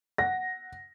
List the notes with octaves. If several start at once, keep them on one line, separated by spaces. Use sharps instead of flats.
F#5 A#6